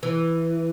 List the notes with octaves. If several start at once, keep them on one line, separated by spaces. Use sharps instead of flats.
E3